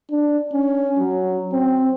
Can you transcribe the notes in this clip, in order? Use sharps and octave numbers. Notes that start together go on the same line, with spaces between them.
D4
C#4
F#3
C4